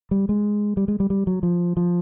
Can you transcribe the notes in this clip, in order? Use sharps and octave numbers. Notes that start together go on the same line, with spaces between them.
G3
G#3
G3
G#3
G3
G3
F#3
F3
F3